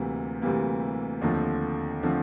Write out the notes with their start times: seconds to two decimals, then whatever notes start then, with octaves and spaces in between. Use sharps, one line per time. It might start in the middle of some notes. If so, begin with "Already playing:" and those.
Already playing: D2 C3 E3 G3 A#3
0.42 D2 C3 E3 G3 A#3
1.21 D#2 D3 F3 A3 C4
2.03 D3 F3 A3 C4